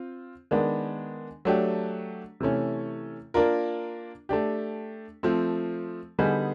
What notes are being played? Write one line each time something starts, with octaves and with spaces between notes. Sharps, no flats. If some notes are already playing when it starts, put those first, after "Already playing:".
Already playing: C4 F4
D#3 G#3 B3 D4
F#3 A3 D4 G4
C3 E3 A3 C#4
A#3 D4 F4 A#4
A3 D4 G4
F3 A3 C4
D3 G3 B3 D#4 G#4